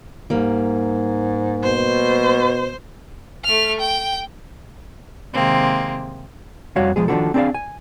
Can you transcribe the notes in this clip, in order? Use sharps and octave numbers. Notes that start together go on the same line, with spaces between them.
G#2 G3 A#3
B2 C5
A3 F6
G5
C3 D#3 G#3 A#3 C4
F2 G3 F#4 C#5 F5
B1 F3 G#3 G#4
D#3 F3 A3 D4 F#4 A4
C4 D4 G#4 A#4 D5 F5
G#5